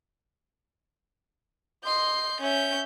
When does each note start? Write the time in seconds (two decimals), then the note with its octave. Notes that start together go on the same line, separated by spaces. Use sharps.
1.84 D#5 C6 G6 C7
2.41 C#4 C#5 E5 G6